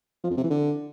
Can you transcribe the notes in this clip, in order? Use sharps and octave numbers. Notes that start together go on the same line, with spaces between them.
F3
F2
C3
E3
D3